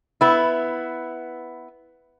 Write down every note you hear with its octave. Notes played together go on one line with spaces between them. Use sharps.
B3 E4